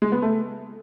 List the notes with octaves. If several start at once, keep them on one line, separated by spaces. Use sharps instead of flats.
G#3
B3
A3